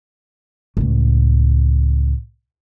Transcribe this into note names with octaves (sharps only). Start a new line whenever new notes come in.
C#2 A2